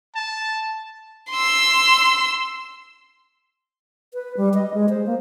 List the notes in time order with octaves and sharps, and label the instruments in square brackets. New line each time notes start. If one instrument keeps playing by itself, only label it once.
[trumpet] A5
[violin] C6 E6
[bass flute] B4
G3
D#5
G#3
C5
A#3